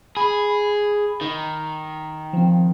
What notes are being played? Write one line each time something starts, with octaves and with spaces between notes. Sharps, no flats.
G#4 B5
D#3
F3 C4